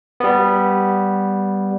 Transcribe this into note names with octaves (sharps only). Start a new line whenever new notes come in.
G3 B3